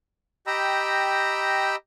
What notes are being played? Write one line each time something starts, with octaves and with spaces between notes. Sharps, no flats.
G4 D#5 G5 A#5 B5 E6